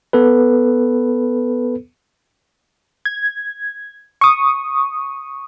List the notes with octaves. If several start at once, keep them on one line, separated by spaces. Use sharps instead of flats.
B3 A4 B4
G#6
C#6 D#6